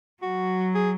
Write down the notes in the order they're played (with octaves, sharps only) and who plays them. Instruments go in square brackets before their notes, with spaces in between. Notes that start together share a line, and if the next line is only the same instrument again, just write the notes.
[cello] F#3 [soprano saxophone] F#4
[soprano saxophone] G#4